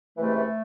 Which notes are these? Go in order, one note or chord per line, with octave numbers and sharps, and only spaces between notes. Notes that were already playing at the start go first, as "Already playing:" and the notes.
C#2 C3 E3 A3